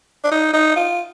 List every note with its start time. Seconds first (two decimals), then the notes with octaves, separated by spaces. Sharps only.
0.24 D4
0.32 D#4
0.53 D#4
0.76 F4